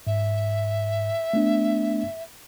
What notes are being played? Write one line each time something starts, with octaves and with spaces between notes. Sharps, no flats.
G#2 E5
A3 B3 D4